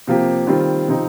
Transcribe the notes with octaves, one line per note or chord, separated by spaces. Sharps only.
C3 F3 A#3 G4
D#3 G3 C4 F4
C3 F3 C4 D#4